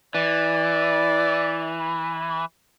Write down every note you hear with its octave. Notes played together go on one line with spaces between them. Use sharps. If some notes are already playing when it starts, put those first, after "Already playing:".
E3 D5